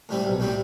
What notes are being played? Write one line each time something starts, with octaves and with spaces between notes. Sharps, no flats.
A2 G3 C4
B1
A2 G3 C4